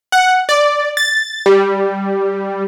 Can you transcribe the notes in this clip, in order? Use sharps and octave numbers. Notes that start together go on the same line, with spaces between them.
F#5
D5
A6
G3